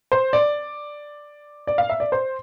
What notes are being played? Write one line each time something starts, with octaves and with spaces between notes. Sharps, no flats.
C5
D5
D5
F5
E5
D5
C5